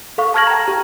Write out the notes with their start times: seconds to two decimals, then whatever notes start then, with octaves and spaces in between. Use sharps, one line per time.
0.18 A4 F5 C#6
0.34 A5 C#6 F6 G#6 A#6 F#7
0.47 G5 A#5
0.68 G4